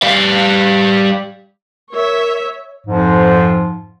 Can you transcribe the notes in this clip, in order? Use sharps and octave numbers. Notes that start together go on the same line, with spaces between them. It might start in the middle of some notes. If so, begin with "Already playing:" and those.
G3 F5
A#4 C#5 E5
F2 G#2 F3